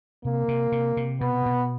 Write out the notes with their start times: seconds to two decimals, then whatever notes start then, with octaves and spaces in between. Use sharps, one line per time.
0.25 C3 A#3
0.48 C3
0.72 C3
0.97 C3
1.21 B2 B3
1.46 B2